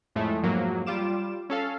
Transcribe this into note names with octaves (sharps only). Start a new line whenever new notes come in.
F2 A2 G#3 A3
F2 G#2 F#3 A#3
G3 F4 D6 E7
C#4 A4 F5